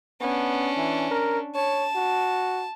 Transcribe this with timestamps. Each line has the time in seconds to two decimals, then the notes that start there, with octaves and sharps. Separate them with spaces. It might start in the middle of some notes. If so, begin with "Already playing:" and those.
0.21 B3 C#4 D4
0.77 E3
1.11 A#4
1.55 C#5 A5
1.95 F#4